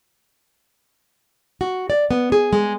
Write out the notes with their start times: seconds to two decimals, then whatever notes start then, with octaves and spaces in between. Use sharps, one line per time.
1.61 F#4
1.90 D5
2.11 B3
2.32 G#4
2.53 G#3